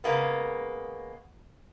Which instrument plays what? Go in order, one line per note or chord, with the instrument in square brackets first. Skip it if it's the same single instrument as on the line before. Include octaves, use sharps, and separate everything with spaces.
[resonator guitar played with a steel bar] C#3 G#3 A#3 B3